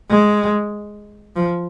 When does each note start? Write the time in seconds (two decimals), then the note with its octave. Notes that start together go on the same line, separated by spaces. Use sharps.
0.10 G#3
1.36 F3